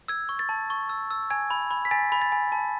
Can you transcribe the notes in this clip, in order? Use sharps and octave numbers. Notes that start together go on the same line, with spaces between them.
E6 G#6
C#6
A6
A5
C#6
E6
E6
G#5 G#6
B5
B5
B6
G#5 A6
B5
A6
G#5
A5